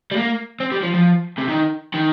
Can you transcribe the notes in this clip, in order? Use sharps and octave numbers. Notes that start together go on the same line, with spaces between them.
G3
A#3
C4
G3
F3
F3
C3
D#3
D#3